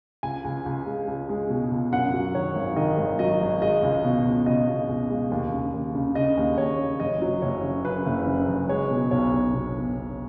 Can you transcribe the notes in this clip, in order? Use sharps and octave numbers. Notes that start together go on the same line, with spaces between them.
C#2 G#5
C#2
C#2
G#3
C#2
G#3
B2
C#2
F#2 F#5
F#3
D#3 C#5
G#1
D#3 D#5
G#1
F#3 D#5
G#1
G#3 D#5
C#2
B2
C#2
C#2 D#5
B2
C#2
G#3
D#2
C#3
D#2
C#3
C#3 D#5
D#2
D#2 C#5
C#3
F#1 D#5
F#3
F#1 C#5
C#3
F#2 B4
F#1
C#3
F#1
G#3 C#5
B2
B1 C#5
B1
B2
B2
B2